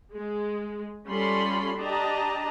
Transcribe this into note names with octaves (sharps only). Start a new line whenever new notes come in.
G#3
G3 C#4 F4 A4 B5 C6
D4 G4 D#5 A5 A#5